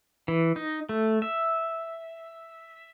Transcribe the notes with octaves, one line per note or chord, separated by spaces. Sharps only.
E3
D#4
A3
E5